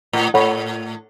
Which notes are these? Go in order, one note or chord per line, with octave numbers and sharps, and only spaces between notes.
A2
A2 A4 C#5 F#5 B5